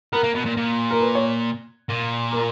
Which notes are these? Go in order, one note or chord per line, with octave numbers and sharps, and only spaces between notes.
B3 A#4
A#3
B2
A#2
A#2
A#4
B4
C#5
A#2
A#4